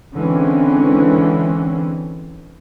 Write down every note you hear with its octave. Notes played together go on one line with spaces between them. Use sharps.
D3 E3 G#3 C4 C#4